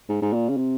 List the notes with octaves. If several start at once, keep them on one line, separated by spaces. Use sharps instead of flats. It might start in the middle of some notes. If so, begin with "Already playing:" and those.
G#2
G#2
A#2
C#3
C3